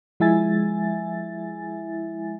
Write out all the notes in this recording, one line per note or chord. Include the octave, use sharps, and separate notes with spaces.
F3 G#3 E4 E5 G#5 A6